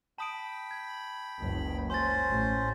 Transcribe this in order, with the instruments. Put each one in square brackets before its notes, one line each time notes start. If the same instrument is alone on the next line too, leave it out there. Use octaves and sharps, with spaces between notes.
[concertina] G5 B5 [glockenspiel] A5 D#6 D7
[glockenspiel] G#6
[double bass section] F#1 C#2
[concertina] C#4 C5 [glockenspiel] C6 A6
[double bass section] A1